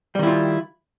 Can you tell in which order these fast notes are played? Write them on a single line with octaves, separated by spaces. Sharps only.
G3 D#3 E4 F4